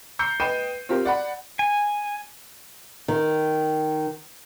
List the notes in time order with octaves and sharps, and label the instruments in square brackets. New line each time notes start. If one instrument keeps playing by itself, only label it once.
[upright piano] A#5 E6 G6 C7 C#7
B4 D#5 G5 C7 D#7 E7
C4 F4 G4 A#4
D5 F#5 B5
[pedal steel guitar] G#5
[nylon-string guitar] D#3